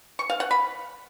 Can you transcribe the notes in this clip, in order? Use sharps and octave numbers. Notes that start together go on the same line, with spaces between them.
C#6
F5
F#5
B5